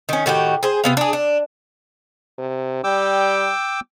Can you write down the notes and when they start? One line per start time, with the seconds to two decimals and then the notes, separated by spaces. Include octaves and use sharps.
0.09 D#3 C#4
0.26 A2 D#3 F#4 G4
0.63 G#4 C5
0.84 C3 B3 F5
0.97 D4 G#4
1.13 D4
2.38 C3
2.84 G3 G5 D6 E6